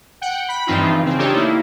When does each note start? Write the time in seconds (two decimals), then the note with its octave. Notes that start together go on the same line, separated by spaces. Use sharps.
0.21 F#5 G5
0.48 B5
0.67 G2 E3 F3 C4 D#4 F4
1.02 C#3 C4
1.18 D4 D#4 F4 G4 A4 C#5
1.33 A#3 E4